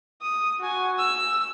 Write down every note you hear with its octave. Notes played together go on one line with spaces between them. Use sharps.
D#6
F#4 G#5
E6